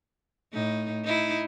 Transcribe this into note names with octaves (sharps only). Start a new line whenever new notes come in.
A2 D#4
D#4 E4